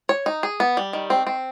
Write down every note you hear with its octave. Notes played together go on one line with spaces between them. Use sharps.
C#5
D#4
G#4
B3
G3
D#3
C4
C4